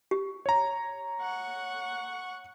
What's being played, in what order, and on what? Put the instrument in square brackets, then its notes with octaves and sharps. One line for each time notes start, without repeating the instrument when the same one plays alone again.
[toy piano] G4
[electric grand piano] C#5 A#5
[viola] F#5 C#6